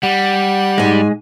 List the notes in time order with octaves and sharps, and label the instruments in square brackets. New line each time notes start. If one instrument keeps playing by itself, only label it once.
[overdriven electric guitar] G3 [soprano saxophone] F#5
[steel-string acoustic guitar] G#2 G#5 [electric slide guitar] G#3